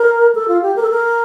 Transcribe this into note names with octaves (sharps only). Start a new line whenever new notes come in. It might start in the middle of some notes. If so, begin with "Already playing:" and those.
Already playing: A#4
A4
F4
G4
A#4
A4
A#4